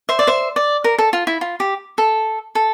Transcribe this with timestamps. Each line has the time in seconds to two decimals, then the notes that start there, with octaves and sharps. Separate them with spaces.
0.09 C5 E5
0.19 D5
0.27 C5 E5
0.56 D5
0.84 A#4
0.98 A4
1.13 F4
1.27 E4
1.41 F4
1.60 G4
1.98 A4
2.55 A4